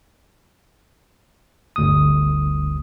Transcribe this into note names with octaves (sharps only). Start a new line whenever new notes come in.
G1 D2 D#6